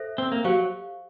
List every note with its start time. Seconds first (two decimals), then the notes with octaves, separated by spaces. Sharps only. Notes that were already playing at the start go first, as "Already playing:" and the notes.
Already playing: A4 C5 E5
0.18 C4
0.32 A#3
0.44 F#3 G4 C5 F5